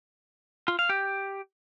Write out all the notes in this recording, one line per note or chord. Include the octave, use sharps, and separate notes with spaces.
F4
F5
G4